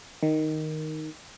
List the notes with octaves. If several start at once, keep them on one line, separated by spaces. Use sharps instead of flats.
D#3